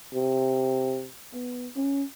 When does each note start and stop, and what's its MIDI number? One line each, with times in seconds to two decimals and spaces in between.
0.14 1.06 48
1.33 1.68 59
1.76 2.03 61